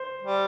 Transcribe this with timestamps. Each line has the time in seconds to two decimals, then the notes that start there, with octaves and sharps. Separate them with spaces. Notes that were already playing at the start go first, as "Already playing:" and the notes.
Already playing: C5
0.22 G3